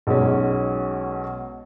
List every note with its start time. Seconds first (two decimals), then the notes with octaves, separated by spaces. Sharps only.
0.07 B1 B2 G#3 C#4